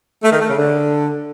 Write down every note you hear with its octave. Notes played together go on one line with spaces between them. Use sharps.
A3
D#3
A3
C#3
D3